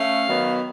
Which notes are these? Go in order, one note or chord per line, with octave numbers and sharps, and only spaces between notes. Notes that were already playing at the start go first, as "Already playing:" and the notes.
Already playing: A3 C#4 F5
D#3 F#3 B3